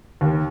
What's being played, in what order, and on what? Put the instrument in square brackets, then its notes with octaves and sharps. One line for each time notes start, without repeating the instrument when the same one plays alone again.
[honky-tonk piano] D#2